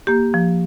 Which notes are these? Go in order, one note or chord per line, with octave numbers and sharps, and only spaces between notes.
A#3 G4
F3